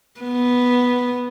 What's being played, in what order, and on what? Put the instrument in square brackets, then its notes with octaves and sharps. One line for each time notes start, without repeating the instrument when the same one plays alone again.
[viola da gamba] B3